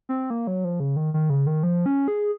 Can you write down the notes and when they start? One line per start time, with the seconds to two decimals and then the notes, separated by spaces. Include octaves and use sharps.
0.09 C4
0.30 A#3
0.47 F#3
0.64 F3
0.80 C#3
0.96 D#3
1.14 D#3
1.30 C#3
1.46 D#3
1.63 F3
1.86 C#4
2.08 G#4